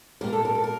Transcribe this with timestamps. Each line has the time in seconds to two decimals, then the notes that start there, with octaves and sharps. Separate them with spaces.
0.21 A#2 G3 A#3 A#4
0.33 A4
0.45 A#4
0.55 A4
0.64 A#4